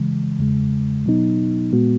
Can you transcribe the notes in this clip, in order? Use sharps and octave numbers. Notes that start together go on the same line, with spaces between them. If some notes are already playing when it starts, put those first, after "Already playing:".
Already playing: C#3 E3 G#3
E2 C#3 G#3
B2 F#3 B3 D#4
A#2 G#3 B3 F#4